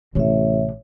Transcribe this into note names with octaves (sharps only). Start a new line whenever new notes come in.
A1 C3 A3 C#5 E5